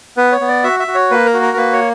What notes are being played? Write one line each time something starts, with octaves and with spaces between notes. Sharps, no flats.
B3 B4
C#5
B3
D5
F#4 E5
E5
F#4
C#5
A#3 B4
A#4
F#4
A#4
A#3 B4
C#5